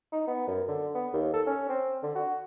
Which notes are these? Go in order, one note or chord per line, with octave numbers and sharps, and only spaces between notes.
D#4
B3
F#2
D3
B3
D#2
A4
C#4
C4
D3
F#4